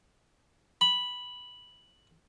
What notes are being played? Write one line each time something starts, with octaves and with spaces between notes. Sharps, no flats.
B5